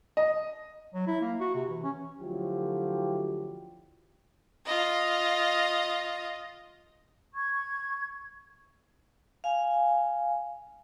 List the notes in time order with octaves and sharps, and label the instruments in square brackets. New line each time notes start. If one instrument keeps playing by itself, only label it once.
[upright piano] D#5
[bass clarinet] F#3
E4
A#3
F#4
C3
E3
C#4
[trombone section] D2 D3 F3 F#3 E4 G4
[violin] F4 D#5
[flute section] C#6 G#6
[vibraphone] F5 G#5